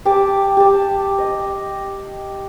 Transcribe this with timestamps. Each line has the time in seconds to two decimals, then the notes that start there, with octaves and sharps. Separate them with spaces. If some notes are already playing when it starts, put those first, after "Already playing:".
0.05 G4 G#5 A5 D6
0.57 G4 A5
1.18 D#5